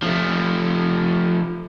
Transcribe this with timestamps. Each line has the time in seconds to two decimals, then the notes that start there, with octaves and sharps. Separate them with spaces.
0.03 F3 A3